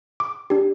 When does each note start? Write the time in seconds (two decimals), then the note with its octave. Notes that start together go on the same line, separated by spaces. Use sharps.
0.20 D6
0.50 D4 G4